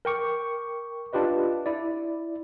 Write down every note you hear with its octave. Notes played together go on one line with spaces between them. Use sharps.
A#4 G5 C#6 D6
D4 F4 G4 B4 D#5
E4 D5